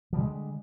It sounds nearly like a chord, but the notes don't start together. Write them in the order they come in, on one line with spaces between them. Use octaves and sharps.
F3 G3 D3 G#3